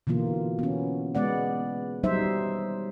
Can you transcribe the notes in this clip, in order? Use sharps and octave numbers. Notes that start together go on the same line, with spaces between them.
B2 D3 E3 A#3 F4
B3 C#4
G#3 B3 D5 F#5
F#3 G3 D#4 C5 E5